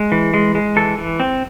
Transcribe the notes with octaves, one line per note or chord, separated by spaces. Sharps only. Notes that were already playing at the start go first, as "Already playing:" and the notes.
Already playing: G#3
E3
G#3
G#3
E3 A4
E3
C4